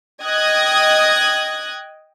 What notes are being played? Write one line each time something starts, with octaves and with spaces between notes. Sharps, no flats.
D#5 G5 D#6 F#6 G#6 A#6